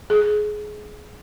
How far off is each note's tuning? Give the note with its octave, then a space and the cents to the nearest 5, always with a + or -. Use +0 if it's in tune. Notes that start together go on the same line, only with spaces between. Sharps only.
G#4 +20